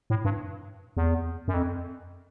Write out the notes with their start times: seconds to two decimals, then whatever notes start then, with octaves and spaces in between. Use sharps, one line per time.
0.10 A2
0.25 G2
0.97 E2
1.48 F#2
1.54 F2